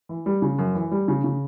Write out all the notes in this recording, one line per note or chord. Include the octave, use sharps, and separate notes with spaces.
E3
G3
C#3
F#2
E3
G3
C#3
C#3